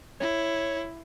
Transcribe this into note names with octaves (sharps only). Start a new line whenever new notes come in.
E4 C#5